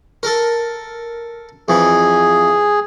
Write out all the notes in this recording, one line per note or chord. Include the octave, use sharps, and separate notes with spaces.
A4 A#4
F2 E3 G#4